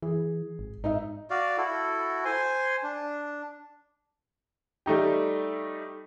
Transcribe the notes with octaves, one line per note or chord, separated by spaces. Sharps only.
E3 G#4
G#1
G#2 D#4 D#5 E5
F#4 D5 F5
E4 F#4 A4
C5 G#5 C6
D4
G3 A3 D#4 G4